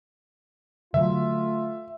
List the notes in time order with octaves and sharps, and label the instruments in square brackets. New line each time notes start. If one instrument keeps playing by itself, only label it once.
[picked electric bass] D3 F#3 [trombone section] A3 F4 [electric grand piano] E5